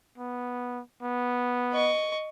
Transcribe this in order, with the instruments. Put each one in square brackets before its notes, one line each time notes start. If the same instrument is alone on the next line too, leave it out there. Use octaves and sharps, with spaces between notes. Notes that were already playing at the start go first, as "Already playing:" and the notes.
[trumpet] B3
B3
[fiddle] D#5 C#6